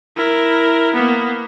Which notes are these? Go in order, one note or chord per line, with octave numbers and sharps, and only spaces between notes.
E4 A#4
A#3 B3